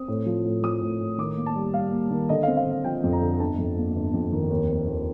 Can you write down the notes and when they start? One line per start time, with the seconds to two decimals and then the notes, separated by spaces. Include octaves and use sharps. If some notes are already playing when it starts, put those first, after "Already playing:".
Already playing: C4 D#6
0.08 A2
0.26 F3
0.45 A2
0.63 F3 D#6
0.81 A2
1.01 A2
1.18 D#3 D6
1.37 A#3
1.46 A5
1.56 G3
1.74 G3 F5
1.92 A#3
2.10 D#3
2.29 D3 D#5
2.43 F5
2.48 C4
2.57 F5
2.66 D3
2.71 F5
2.84 F3 G5
3.04 F2
3.13 A#5
3.21 D3
3.39 G1 A5
3.58 F2
3.77 A#3
3.95 G1
4.14 F2
4.32 D#3
4.50 D#2
4.69 C4
4.87 D#2